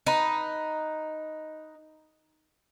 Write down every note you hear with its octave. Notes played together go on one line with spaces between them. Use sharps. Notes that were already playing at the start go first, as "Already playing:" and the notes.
D#4 B4